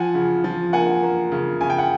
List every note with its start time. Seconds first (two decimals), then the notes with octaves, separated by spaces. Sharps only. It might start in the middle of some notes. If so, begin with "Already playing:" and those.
Already playing: F3 F#5 G#5
0.14 C#3
0.44 F3
0.73 A#3 F#5 G#5
1.03 A#3
1.32 C#3
1.61 C#3 G#5
1.70 G5
1.78 F#5